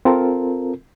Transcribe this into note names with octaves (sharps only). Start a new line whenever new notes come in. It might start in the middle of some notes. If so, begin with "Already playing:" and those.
C4 F4 A4 A#4